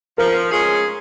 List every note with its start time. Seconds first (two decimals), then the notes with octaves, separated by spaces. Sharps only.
0.18 F3 A#4
0.52 G#3 C#4 G#4